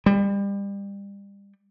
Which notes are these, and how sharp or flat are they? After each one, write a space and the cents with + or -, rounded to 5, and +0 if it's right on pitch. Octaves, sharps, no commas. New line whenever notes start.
G3 +30